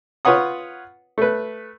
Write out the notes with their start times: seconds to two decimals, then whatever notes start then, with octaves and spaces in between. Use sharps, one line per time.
0.25 F4 B4 C#5 F#5 D#6
1.18 A3 B4